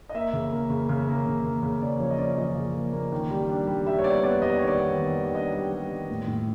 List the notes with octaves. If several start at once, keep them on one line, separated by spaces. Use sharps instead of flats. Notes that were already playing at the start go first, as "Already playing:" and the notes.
D#5
A#3 E5
C#3
A#3
C#3
C#3
A#3
C#3
A#3
C#3
C#4 D5
F3 C#5
D#5
C#4 D5
F3 D#5
C#3
A#3
A#3
D#3
G3
D4
G3
G3 E5
C#5
B3 D5
B3 D5
G3 D#5
D5
D#3 C#5
D5
B3
D#3
G3
D5
D4 D#5
G3
G3
D#3
A2
A2